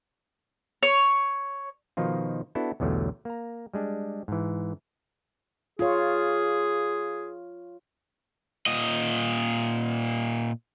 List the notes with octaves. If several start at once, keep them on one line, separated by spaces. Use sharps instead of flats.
C#5
B2 D#3 F3 D#4 F4
B3 D4 E4 F#4 A4
B1 E2 D3 F#3 G3 A3
A#3 A#5
G3 G#3 D4
G#2 E3
F4 G#4 C#5
A#2 D#5